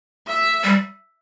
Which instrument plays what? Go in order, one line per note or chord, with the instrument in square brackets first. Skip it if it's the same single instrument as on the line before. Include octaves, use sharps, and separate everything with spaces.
[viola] E5
[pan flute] G3